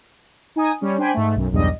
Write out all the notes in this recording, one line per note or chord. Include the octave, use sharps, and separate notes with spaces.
D#4 G#5 D#6
G3 C#4
D4 C5 G5 G#5 B5
G#2 A3
B1 F#2
B1 E2 G2 G3 D#5